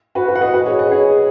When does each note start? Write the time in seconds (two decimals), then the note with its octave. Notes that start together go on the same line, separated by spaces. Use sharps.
0.15 F#4 B4
0.28 F#4 B4
0.35 F#5
0.41 B4 D#5
0.54 F#4 B4
0.66 G#4 C#5
0.79 B4 D#5
0.91 G#4 C#5